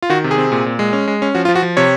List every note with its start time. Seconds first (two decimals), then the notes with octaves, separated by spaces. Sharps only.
0.02 F4
0.10 D#3 F#4
0.24 C3
0.31 G#4
0.38 C4
0.52 A#2
0.66 A#2
0.79 G#3
0.93 C#4
1.07 G#3
1.22 C#4
1.35 F3 F#4
1.45 F4
1.49 F3
1.55 F#4
1.62 F3
1.77 C3 C#5